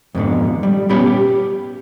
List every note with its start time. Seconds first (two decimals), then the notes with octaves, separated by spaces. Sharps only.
0.15 F2 G#2 B2 D3
0.63 G3
0.89 A#2 B3 C#4 G4 B5
1.07 G4